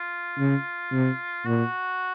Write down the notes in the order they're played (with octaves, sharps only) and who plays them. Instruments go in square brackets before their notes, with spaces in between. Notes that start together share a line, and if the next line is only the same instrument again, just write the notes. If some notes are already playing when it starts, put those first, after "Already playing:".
Already playing: [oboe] F4
[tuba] C#3
C3
[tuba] A#2 [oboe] F#4